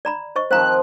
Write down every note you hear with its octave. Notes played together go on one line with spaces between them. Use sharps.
D5 A#5 B5
C5 D#5 C#6
D#3 F3 C4 C5 F5 A#5 F#6